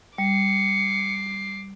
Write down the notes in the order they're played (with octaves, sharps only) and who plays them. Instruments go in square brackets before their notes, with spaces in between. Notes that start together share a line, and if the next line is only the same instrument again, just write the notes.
[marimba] G3 [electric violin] D6 C7 [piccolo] C#7